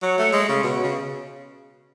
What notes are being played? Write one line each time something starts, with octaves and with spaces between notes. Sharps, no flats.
F#3 C#5
A3
G#3
C#3
B2
C#3